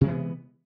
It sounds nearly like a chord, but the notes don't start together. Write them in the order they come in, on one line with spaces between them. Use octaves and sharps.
C3 G#3 E3 B3